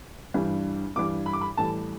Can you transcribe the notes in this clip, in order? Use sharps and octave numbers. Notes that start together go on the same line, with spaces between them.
G2 E3 G3
G2 E3 G3 D6
B5
D6
B5
A2 E3 G3 A5